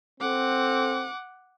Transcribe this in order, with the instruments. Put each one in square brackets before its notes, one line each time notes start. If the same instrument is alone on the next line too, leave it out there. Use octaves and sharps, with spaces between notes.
[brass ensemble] C4 A4 [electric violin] F#5 D6